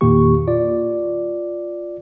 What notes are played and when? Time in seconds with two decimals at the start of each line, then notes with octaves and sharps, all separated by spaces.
0.01 E2 A#2 D#3 A#3 G4 C#6
0.47 F4 D5